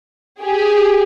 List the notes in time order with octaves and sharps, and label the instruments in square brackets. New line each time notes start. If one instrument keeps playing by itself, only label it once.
[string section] G4 G#4